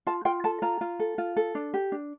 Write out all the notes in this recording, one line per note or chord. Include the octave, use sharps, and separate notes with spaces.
F4 A5
F4 G5
A4 A5
F4 A#5
F4
A4
F4
A4
D4
G4
D4